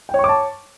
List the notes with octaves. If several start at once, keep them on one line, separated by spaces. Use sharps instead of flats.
C#5 G5 A5 C#6 D6